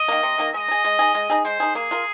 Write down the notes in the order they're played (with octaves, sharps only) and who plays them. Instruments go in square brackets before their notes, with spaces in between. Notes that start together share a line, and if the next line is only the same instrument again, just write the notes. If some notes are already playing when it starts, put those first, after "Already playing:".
Already playing: [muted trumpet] D#5
[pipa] D#3 A#3
C3
D#3 A#3
[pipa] G#3 [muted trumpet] D#5
[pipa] D#4
G#4
G#3
D#4 G#4
G#3
D#4 G#4
[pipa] G#3 [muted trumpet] C5
[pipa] D#4 G#4
[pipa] A#3 [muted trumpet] G#4
[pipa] F4 A#4